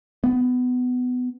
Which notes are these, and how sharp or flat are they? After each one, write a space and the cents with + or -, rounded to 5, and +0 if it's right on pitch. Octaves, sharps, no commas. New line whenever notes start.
B3 +20